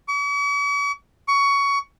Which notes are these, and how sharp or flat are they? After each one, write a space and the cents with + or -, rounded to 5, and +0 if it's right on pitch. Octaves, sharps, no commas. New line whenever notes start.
C#6 +45
C#6 +20